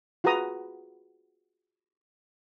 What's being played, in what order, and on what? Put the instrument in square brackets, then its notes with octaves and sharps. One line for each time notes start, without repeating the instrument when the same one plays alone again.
[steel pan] F4 F#4 G#4 B4 A#5 D#6